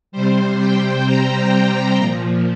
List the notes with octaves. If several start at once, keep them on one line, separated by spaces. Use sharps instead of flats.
C3 G3 C5
G5
A#5
A#2 F3